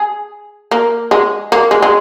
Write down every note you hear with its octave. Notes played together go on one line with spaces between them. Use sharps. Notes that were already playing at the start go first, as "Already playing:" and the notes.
Already playing: G#4
A#3
G#3
A#3
G#3
G#3